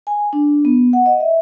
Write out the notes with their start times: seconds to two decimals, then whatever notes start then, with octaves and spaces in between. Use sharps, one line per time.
0.07 G#5
0.33 D4
0.65 B3
0.93 F#5
1.06 D#5
1.20 E5